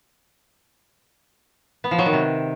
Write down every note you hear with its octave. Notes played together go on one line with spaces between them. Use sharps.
B3
F3
F#3
D#3
C3